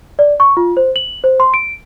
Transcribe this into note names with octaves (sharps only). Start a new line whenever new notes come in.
D5
C#6
F4
C5
F#7
C5
C6
D7